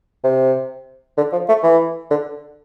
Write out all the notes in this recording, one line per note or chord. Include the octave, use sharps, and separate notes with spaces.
C3
D3
F3
A3
E3
D3